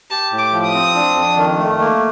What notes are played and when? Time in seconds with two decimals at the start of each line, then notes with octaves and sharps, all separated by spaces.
0.10 G4 A5
0.31 A2
0.38 D6
0.53 F3
0.67 D#6
0.74 C4
0.95 D4
1.16 F2
1.37 D#3
1.58 A3
1.80 A#3